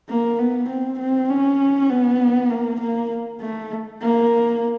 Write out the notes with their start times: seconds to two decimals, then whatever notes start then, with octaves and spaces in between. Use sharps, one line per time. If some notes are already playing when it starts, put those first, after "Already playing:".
0.09 A#3
0.39 B3
0.69 C4
0.99 C4
1.30 C#4
1.90 B3
2.51 A#3
2.81 A#3
3.41 A3
4.02 A#3